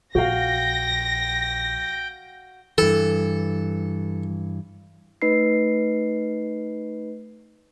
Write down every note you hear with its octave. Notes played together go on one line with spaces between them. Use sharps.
A#1 F#4 F5 G5 A#6
G2 E3 A4
A3 D#4 B4 D#5 B5 C7